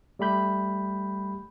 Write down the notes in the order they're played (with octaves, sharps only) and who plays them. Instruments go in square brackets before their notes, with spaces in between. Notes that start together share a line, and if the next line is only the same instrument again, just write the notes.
[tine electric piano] G3 A3 G4 B5 G6